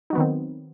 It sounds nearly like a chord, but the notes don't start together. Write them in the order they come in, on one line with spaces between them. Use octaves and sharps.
D#4 F#3 B3 D#3 C4